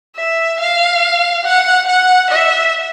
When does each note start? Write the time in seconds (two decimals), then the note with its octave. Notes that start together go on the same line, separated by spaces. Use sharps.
0.16 E5
0.59 F5
1.45 F#5
1.88 F#5
2.30 E5